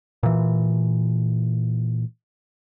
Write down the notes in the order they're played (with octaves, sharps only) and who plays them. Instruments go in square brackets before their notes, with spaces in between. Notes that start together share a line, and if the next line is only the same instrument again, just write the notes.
[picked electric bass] A#2 E3